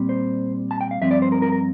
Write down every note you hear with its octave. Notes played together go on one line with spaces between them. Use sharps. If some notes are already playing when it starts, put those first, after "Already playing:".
Already playing: A#2 G3 C4
C5
A5
G5
F5
G2 F3 C4 E5
D5
C5
A#4
A#4
A#4